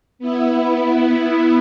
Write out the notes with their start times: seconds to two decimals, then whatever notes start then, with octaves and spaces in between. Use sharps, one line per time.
0.19 B3 E4